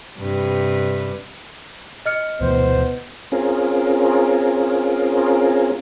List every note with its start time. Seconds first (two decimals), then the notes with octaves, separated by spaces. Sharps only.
0.18 G2 C3 B4
2.06 D#5 F6 C#7
2.41 D2 B2 E3 B3 C5
3.32 C4 C#4 F4 G#4 A#4